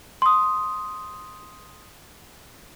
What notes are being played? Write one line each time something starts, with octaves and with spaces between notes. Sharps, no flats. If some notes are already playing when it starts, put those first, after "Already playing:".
C6 D#6